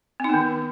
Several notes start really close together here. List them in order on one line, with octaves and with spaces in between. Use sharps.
C4 D#4 B3 D#3